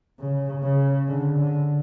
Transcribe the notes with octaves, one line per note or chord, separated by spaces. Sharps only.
C#3
C#3
D3
D3